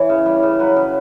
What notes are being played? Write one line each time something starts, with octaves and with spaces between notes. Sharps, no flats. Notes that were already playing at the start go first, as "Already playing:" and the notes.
Already playing: E3 C#5
C#3
G3
C#3
F#3 B4
C#3